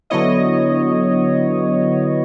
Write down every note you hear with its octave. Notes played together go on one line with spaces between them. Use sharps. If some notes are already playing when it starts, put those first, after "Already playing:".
D3 F#3 B3 E4 C#5 D#5